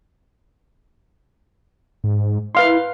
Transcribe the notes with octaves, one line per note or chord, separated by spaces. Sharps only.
G#2
E4 B4 F5 C6